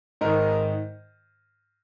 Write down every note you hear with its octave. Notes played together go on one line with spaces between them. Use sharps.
G#2 D#3 A#4 D#5